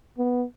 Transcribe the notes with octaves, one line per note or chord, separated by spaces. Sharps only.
B3